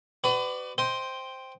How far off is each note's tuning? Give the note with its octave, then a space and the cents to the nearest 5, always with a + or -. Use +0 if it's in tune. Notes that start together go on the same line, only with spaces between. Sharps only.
F#4 +40 B4 +35 D5 +20
C5 +0 D#5 +15 G5 +0